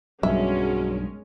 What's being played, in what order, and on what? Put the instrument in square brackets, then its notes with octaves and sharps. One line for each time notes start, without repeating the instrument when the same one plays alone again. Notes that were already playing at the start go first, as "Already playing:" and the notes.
[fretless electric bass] B1 G2 [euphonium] F#3 [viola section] G#3 C#4 A#4 [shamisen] E5